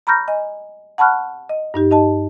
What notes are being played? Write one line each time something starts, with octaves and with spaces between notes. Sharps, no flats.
A#5 B5 C#6 F6 G6 A#6
D#5 G#5
F#5 A5 B5 C#6 F6 F#6
D#5
G2 D#4 G4
D#4 D#5 A5